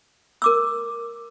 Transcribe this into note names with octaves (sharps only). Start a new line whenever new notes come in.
A#4 D6 E6